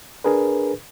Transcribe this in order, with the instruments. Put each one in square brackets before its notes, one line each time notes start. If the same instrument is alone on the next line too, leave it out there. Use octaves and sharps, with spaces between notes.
[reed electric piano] D4 G#4 A#4 B4